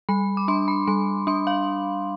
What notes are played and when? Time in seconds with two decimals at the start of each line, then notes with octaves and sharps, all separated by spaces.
0.09 G3 B5
0.37 D6
0.48 D4 C6
0.68 B5
0.87 G3 C6
1.27 D4 C6
1.47 F5